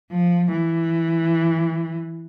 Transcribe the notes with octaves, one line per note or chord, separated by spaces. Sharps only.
F3
E3